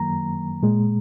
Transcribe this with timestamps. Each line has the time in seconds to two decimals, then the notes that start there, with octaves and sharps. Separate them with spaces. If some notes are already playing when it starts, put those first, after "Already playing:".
Already playing: F#2 D#3 F#3 A#3 A#5
0.63 A#2 G#3